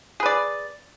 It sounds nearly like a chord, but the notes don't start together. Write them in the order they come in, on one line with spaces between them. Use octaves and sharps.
G#4 B4 D5